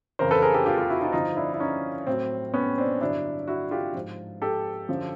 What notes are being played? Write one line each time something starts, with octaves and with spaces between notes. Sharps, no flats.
F2 C#3 E3 A#4 C5
A4 B4
G#4 A#4
G4 A4
F4 G4
F4 G4
E4 F#4
D#4 F4
G2 D3 F3 D#4 F4
D4 E4
E4
C#4 D#4
A2 F#3 C4
B3 C#4
C4 D4
G2 D3 F#3 D4 E4
E4 F#4
F4 G4
G#2 F3
G4 A4
F#2 D3 F3